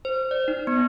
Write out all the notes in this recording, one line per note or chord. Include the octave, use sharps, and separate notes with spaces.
C5
D5
D#4
B3